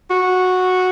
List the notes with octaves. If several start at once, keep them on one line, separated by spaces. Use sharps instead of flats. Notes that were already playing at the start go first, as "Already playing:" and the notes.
F#4